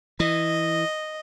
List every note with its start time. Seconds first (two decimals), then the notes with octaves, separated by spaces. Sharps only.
0.20 E3 D#5